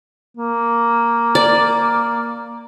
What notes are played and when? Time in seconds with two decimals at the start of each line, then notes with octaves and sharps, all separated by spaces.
0.37 A#3
1.35 D5